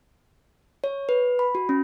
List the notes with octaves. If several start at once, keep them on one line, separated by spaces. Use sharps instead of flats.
C#5
B4
B5
F#4
C#4